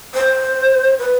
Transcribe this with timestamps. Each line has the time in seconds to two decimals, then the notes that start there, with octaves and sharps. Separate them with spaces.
0.14 C5
0.99 B4